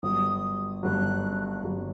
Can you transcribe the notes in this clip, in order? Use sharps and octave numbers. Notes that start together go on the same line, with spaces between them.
G1 G2 F#3 D#6
G1 G2 F#3 F#6
G1 G2 F#3